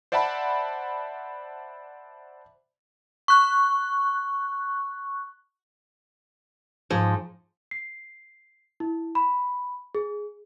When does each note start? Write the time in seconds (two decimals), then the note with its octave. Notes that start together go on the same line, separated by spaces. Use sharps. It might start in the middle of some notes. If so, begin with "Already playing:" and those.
0.12 C5 D5 E5 F#5 A5 B5
3.28 C#6 F#6
6.90 G#2 F3
7.71 C7
8.80 E4
9.15 B5
9.95 G#4